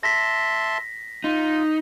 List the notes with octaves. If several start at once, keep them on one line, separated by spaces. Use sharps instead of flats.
E5 A5 C6 A#6 B6
D#4 F4